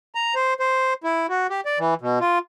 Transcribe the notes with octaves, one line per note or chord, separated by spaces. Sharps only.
A#5
C5
C5
E4
F#4
G4
D5
E3
B2
F4